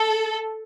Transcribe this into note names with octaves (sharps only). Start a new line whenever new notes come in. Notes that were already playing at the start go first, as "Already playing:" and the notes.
Already playing: A4